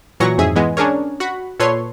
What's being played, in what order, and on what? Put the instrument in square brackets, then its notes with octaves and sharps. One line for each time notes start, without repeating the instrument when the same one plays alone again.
[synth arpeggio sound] A#2 E3 F#3 C#6 A#6
F2 G#2 G#4 E5
E3 G#3 B3
C#4 D4 G#4 A#4 C#5
F#4 F#5 B5
A#2 A4 B4 C#5 C6